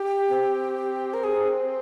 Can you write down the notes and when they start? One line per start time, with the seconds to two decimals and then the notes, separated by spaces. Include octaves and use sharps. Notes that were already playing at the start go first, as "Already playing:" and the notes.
Already playing: G4
0.31 C4
1.14 A#4
1.24 G#4